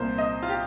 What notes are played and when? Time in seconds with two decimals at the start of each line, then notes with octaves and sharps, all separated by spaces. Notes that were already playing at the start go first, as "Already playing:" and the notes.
Already playing: C2 A#2 A#3 C5
0.18 D#5
0.42 F4
0.49 G4